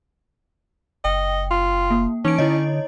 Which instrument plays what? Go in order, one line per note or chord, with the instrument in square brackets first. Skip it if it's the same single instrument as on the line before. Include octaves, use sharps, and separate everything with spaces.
[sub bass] F#1 [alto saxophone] D#5 [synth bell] G5
[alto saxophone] F4
[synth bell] A#3
[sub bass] E3 [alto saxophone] C#4 [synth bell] D#4 D7
[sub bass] D3 [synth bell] E4 C#5 D#5